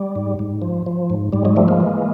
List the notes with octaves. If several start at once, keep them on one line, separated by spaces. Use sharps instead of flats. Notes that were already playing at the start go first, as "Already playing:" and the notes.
Already playing: G3
G#2
G#2
F3
F3
G#2
G#2 G3
F#3 G#3
F3 G3 A3
G#3 A#3
E3